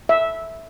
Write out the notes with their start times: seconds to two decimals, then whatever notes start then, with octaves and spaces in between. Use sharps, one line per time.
0.09 E5